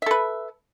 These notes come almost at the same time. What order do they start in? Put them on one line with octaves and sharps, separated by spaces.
E5 A4 B4